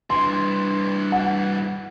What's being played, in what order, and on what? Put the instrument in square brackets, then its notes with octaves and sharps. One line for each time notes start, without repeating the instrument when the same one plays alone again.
[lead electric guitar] G2 E3 [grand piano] C6
[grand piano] F#5